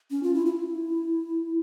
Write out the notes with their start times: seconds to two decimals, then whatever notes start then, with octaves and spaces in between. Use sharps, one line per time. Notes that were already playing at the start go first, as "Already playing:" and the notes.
0.11 C#4
0.23 F4
0.34 E4
0.46 E4